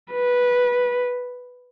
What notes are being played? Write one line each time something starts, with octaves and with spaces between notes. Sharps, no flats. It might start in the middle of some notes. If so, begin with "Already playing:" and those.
B4